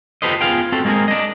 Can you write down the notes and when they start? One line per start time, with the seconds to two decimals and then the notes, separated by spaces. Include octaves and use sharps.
0.22 F4 G4 A4 B4 C5 D#5
0.41 B3 F4 G4 G#4 F5 G5
0.72 C4 F#4 A4
0.85 G#3 A#3 C4 G4 G#4 A#4
1.08 D4 D#5